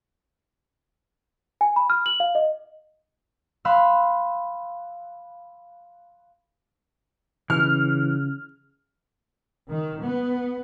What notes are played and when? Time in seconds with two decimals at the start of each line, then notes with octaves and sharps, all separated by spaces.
1.61 G#5
1.76 B5
1.90 F6
2.06 F#7
2.20 F5
2.35 D#5
3.65 F5 B5 C6 E6 F#6
7.50 C#3 E3 F6
9.69 D#3
10.05 B3